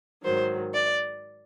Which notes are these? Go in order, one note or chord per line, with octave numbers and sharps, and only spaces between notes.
G#2 D#3 F#3 C5
D5